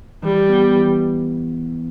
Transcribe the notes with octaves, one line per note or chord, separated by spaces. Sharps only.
E3 G3
B3
E3